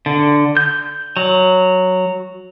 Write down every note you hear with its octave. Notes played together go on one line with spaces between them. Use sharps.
D3
G6
F#3